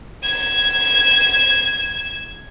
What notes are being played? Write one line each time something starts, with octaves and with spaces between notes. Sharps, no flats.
G#6 E7